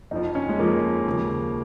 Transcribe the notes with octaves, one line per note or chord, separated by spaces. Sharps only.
F2 F3 D#4
C#4
G#3
F2 F3 A#3
D#2 C#3 F3